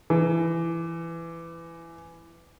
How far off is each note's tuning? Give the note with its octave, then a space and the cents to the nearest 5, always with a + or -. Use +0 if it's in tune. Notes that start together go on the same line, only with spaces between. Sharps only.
E3 +20